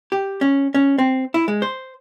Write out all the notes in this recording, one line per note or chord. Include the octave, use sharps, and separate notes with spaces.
G4
C#4
C#4
C4
E4
G#3
C5